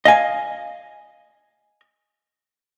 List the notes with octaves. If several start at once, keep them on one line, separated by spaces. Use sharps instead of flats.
D#5 F5 G#5